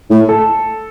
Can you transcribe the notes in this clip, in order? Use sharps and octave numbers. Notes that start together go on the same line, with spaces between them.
A2
A4